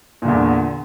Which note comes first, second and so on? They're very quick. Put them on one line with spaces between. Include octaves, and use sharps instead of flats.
A#2 D3 E2